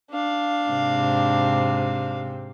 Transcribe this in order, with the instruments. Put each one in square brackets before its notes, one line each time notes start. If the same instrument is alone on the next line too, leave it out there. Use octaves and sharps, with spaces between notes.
[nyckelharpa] D4 F5
[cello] G#2 C3